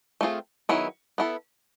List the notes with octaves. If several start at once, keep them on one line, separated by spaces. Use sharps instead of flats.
A3 C4 F4 G#4
D#3 F#3 B3 E4 G#4
B3 E4 A4